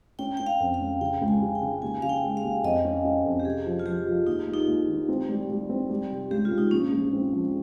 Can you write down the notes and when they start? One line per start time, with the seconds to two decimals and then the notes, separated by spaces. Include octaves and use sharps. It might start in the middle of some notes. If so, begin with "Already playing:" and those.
0.19 C#4 G5
0.37 C#4 G5
0.47 F5
0.60 F2
0.74 F5
0.81 C#4
1.01 C#3 G5
1.22 C#2
1.28 G#5
1.42 C#3
1.55 G5
1.62 C#3
1.82 D#2 G#5
2.02 C#3 F5
2.09 G5
2.23 G#3
2.37 F5
2.44 D#2
2.63 F2 D#5
2.85 C#4
3.05 C#4
3.25 F2
3.40 G4
3.45 C3 G#4
3.66 F3
3.79 F4
3.86 F3 G4
4.07 F3
4.27 D#2 D#4
4.47 A#3
4.54 D#4
4.68 D#2
4.88 D#3
5.08 C4
5.29 G3
5.49 G3
5.69 C4
5.90 G3
6.11 C3
6.31 C#2 G4
6.45 F4
6.51 C#2
6.58 D#4
6.71 A#1 C#4
6.92 A#1
7.13 C4
7.33 F3